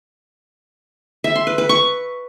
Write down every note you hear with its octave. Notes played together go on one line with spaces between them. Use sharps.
E5
C6
B4
B4
C#6